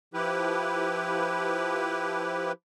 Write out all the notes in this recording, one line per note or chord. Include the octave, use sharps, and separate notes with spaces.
F3 E4 G4 B4